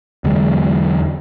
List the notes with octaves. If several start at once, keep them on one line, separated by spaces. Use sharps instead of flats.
E2 D3 F#3 G#3